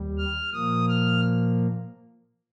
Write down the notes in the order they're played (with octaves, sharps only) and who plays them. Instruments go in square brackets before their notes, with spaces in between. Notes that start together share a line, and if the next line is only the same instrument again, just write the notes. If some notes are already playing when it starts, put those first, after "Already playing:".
Already playing: [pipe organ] D#2 G3
F6
A#2 F3 A#3 D#6
F6